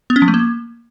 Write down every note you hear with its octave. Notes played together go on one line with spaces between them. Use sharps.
B3
C#4
F3
A3
A#3